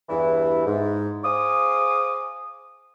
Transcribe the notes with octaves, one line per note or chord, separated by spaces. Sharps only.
E2 G2 E3 E4
G#2
G#4 C5 F5 D6 D#6